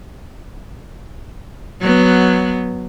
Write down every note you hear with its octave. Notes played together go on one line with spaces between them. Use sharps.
F#3 B3